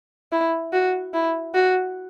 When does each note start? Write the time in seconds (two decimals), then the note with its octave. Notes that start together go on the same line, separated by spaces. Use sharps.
0.32 E4
0.73 F#4
1.13 E4
1.54 F#4